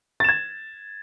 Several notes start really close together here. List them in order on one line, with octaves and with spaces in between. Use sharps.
A6 E7 G#6